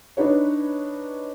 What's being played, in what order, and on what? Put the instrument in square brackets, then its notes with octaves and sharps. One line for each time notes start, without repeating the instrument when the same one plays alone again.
[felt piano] D4 D#4 B4 C#5